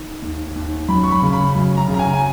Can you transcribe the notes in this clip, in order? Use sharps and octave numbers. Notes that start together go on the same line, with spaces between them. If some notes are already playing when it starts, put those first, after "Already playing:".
Already playing: D#3
D#2
D#2
F#2 B5
C#6
B5
C#3
B5
F#2
A#5
C#3
A#5
G#5
G#5